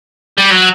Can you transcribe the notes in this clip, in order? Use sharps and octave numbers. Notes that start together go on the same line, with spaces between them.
G3
F#3